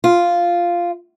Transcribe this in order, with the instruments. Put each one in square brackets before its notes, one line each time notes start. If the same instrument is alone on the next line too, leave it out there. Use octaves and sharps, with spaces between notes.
[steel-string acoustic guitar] F4